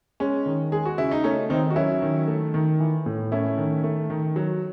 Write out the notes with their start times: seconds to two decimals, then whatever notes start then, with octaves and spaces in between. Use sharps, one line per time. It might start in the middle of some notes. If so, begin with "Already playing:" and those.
0.20 G#3 C#4
0.46 D#3
0.72 G#3 G#4
0.85 F#4
0.98 C#3 E4
1.11 D#4
1.24 A3 C#4
1.50 D#3 C4 D#4
1.70 F#4
1.76 F#3 C#4 E4
2.02 D#3
2.28 A3
2.54 D#3
2.80 E3
3.06 A2
3.32 A3 C#4 E4
3.58 D#3
3.83 A3
4.10 D#3
4.36 F#3